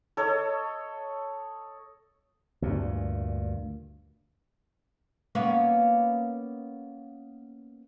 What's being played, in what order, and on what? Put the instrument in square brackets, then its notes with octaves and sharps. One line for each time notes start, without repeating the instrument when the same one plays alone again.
[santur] A4 C#5 D#5
[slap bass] D2 G2 A#2
[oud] A#3 B3 C#4